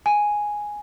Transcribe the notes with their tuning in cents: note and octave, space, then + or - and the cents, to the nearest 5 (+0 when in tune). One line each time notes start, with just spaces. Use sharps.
G#5 +0